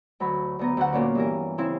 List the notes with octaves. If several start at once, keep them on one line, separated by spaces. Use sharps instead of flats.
D2 F#3 B5
D2 B3 A#5
D2 D3 F#5
A#2 C#4 D5
G2 E3 A#4
C#3 C4 E4